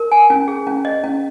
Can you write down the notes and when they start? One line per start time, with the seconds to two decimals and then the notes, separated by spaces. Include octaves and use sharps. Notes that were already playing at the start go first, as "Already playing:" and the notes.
Already playing: A#4
0.12 G#5
0.30 C#4
0.48 G#4
0.67 C#4
0.85 D#5
1.04 C#4